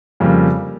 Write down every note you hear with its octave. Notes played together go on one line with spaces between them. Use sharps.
F2 C#3 G3 A#3